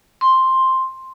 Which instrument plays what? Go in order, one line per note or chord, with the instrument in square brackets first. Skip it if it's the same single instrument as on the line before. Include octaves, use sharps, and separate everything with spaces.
[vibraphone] C6